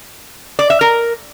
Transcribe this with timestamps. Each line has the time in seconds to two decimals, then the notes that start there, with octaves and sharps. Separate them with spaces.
0.59 D5
0.70 E5
0.81 A#4